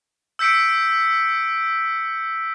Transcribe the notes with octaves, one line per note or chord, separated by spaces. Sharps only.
E6 G6 B6 C#7 D7